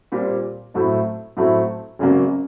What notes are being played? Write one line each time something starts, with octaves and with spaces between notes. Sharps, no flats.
A#2 G3 C4
A2 F#3 A3 C4 E4
A2 F#3 A3 C4 E4
G#1 F#2 C#3 F#3 A#3